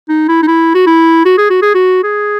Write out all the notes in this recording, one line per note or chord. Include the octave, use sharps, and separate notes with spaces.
D#4
E4
D#4
E4
F#4
E4
F#4
G#4
F#4
G#4
F#4
G#4